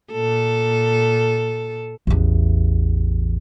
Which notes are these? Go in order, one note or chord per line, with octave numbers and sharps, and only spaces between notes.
A#2 A4
A1 E2